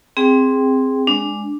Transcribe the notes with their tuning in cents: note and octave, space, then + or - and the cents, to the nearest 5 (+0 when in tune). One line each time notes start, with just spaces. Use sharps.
C4 +0 G#4 -10 G5 -5
G#3 +0 D4 +0